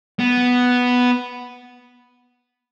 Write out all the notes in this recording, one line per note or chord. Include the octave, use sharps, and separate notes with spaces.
B3